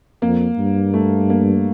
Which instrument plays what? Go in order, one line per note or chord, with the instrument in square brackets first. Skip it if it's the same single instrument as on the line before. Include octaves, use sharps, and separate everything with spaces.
[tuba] F2 [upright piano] A#3
[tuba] G2
[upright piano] A3
A#3